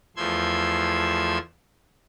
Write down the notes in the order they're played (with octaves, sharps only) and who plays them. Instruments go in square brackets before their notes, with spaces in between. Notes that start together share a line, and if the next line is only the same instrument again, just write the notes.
[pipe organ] E2 F3 A3 C6 E6 G#6